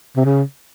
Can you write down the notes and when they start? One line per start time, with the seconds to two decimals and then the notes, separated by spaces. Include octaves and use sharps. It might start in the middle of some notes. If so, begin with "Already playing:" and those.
0.17 C3
0.25 C#3